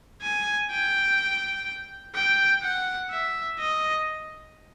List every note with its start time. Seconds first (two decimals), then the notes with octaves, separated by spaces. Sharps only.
0.22 G#5
0.70 G5
2.15 G5
2.63 F#5
3.10 E5
3.59 D#5